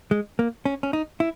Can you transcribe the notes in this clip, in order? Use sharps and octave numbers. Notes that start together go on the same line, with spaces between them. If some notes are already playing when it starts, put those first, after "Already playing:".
G#3
A#3
C#4
C#4
D#4
E4